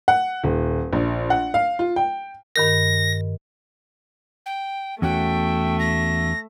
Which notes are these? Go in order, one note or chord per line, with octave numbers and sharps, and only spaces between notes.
F#5
D#1
A#1
F#5
F5
F4
G5
G2 D#3 A#4 A#6
G5
E2 A3 C#4 F#4 E5 G5
A#6